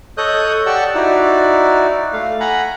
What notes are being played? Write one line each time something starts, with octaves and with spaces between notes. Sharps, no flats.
A4 C#5 D#5 D#6 F#6 G6
G4 D5 F#5 A5 C#6 E6
D#4 E4 F#4 D5
A3 F5
F#5 G#5 A#5 B5